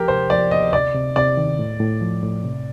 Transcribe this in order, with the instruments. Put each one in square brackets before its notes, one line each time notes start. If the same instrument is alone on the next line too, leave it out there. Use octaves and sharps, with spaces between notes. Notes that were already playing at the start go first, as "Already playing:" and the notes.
Already playing: [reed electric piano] F3 [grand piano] G4 A#4
[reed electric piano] C3 [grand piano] C5
[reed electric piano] F3 [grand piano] D5
[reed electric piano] D2 [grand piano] D#5
[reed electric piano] C3 [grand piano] D5
[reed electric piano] C3
[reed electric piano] C3 [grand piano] D5
[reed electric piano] D#3
A2
A2
F3
A2
C3